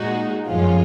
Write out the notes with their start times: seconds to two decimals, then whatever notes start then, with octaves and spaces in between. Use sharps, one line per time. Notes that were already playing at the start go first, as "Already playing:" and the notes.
Already playing: A#2 G#3 D#4 F#4
0.47 F#2 F3 G#3 C#4 F4